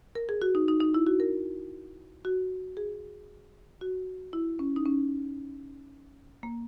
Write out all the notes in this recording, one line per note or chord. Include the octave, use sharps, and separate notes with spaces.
A#4
G#4
F#4
D#4
D#4
D#4
E4
F#4
A#4
F#4
G#4
F#4
E4
C#4
D#4
C#4
A#3